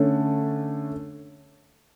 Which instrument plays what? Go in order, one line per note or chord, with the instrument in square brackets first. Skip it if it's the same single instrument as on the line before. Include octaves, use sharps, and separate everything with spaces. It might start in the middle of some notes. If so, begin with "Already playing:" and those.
Already playing: [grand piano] D3 A3 C#4